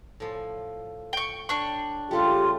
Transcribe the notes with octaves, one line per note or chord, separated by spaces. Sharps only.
A2 F3
G5 C#6
D4 C#5 G5 C#6
C#3 G3 A3 F4 G4